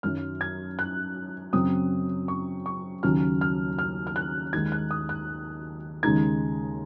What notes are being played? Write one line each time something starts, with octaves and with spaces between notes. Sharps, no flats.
F#2 D#3 F#3 F6
G#6
F#6
F#2 C#3 F#3 C4 D#6
C#6
C#6
D#2 C#3 F#3 C#4 F6
F6
F6
F6
F#6
D#2 D#3 G#3 D#4 G#6
F#6
D#6
F#6
D#2 C#3 G#3 D#4 G#6